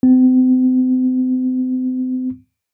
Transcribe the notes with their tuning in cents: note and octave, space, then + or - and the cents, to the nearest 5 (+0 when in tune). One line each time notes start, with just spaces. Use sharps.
C4 -40